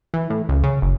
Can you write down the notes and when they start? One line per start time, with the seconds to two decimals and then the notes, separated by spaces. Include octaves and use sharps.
0.14 E3
0.30 A2
0.49 C#2
0.63 C#3
0.82 F#1